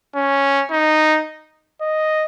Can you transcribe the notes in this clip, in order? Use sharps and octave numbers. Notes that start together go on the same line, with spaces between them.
C#4
D#4
D#5